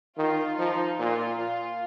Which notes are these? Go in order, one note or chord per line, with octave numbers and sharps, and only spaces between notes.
D#3 F4
F3 D#4
A#2 F4
F4